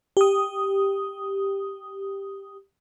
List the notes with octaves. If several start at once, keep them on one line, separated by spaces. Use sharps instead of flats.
G4 D#6